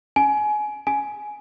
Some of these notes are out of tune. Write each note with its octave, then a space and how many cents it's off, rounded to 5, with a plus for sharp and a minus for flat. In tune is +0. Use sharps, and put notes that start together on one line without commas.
G#5 +25
G#5 +10